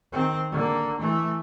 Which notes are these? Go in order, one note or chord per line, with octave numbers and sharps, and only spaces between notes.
D#3 C4
D3 A#3
E3 A3